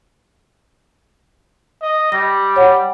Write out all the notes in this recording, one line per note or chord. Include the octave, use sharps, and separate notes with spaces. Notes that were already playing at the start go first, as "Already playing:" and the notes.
D#5
G3 A#6
C#5 F#5